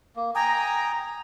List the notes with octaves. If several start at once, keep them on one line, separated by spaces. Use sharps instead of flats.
A#3
G5 G#5 A#5 D#6